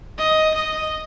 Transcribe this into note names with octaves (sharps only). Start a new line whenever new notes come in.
D#5
D#5